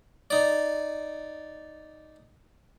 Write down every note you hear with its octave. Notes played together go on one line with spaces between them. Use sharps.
D#4 D5